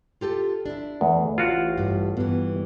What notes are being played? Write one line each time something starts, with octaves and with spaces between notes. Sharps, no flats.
F4 G4 A4
D4 E4
E2 A3
A1 F4 F#4
G2
G2 E3 B3